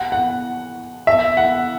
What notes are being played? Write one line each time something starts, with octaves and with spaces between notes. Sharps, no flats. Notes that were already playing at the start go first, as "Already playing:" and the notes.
Already playing: F#5
F#5
E5
F#5